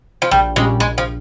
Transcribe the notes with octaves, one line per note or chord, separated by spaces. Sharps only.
F3
A#1 G3
A#2 G3 G#3 C#4
A#1 G#3
F3